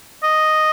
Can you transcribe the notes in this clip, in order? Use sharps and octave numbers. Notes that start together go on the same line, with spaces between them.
D#5